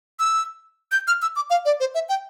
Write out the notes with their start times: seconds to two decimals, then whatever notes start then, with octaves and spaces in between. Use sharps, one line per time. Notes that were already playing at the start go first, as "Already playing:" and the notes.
0.19 E6
0.92 G6
1.07 F6
1.22 E6
1.36 D6
1.50 F5
1.65 D5
1.80 C5
1.94 E5
2.09 G5